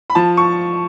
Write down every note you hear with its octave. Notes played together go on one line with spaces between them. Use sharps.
B5
F3 A5
C#6